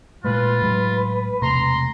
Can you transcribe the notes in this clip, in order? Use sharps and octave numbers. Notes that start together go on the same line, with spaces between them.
A#2 G#3 A3 F4 B4
A2 F#3 G#3
E1 C3 A3 A#5 C6